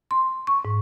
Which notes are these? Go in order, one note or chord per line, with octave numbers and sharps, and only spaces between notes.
C6
C#6
G#2